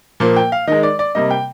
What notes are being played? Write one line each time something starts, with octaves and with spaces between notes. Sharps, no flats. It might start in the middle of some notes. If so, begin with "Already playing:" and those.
A#2 F3 A#3
G5
F5
D#3 G#3 D#5
D5
D5
C3 G3 A#3 D#5
G5